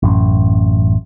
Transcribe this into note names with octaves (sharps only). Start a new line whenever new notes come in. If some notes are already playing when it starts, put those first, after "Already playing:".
A1 F#2